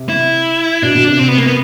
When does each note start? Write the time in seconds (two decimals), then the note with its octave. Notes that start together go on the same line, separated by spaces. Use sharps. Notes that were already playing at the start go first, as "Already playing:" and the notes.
Already playing: C3
0.09 E4
0.82 B2 D4
0.95 B2
1.07 C3
1.19 C4
1.28 B3
1.38 A#3
1.47 B3